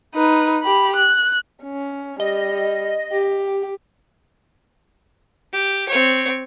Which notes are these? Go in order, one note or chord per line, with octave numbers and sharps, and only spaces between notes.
D#4 B4
G4 B5
F#6
C#4
G3 D#5
G4
G4
C4 C#5